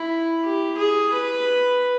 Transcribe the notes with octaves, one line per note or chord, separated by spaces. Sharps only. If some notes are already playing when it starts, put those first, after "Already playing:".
Already playing: E4
G4
G#4
B4